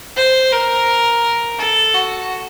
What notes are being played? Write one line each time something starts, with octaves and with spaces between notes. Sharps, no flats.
C5
A#4
A4
F#4